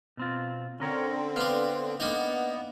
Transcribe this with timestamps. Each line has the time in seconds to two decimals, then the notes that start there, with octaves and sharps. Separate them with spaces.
0.17 B2 C4 F4
0.80 D3 C4 C#4 A#4 C#5
1.36 B3 D4 F5
2.00 A#3 B3 D4 D#4